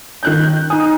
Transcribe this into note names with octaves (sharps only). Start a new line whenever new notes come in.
D#3 F#6 G6
D#4 G#5 D#6